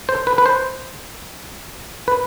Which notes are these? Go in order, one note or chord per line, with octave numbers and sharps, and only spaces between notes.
C5
B4
B4
C5
B4